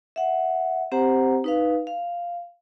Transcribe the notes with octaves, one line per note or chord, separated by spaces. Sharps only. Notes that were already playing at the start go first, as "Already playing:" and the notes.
E5 F#5
C4 G4 C5 F#5 A#5
D#4 B4 F5
F5